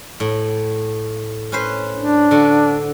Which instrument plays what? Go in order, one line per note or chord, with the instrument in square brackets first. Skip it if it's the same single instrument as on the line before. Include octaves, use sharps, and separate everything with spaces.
[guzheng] A2
C#4 B4 C5
[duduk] D4
[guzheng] D3 F#4